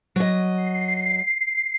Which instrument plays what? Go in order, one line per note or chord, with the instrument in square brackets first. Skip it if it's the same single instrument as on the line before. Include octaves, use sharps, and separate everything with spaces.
[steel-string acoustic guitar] F#3 D#5
[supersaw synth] C7